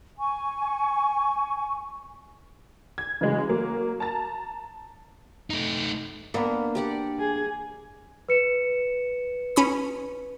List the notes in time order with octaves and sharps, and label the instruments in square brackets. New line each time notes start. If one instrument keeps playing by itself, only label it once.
[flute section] G#5 C#6
[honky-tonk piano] G#6
C#3 E3 F#3 G#3
F#3 A#3
A5 A#5 A6
[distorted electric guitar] A3 D#4
[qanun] A#3 [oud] B3 D4
[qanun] G4 D5 F#5
[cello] G#4
[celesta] B4 C#7 E7
[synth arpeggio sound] C#4 B5 D#6